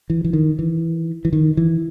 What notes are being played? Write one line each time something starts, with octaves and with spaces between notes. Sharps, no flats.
E3
E3
D#3
E3
E3
D#3
E3